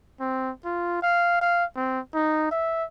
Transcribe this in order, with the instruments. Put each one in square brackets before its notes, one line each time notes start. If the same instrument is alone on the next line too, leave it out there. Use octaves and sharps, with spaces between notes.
[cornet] C4
F4
F5
F5
C4
D#4
E5